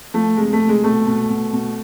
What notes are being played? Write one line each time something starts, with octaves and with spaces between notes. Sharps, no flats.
F3 A3
C3 G#3
A3
C3
G#3
B2 A3
B2
B2
B2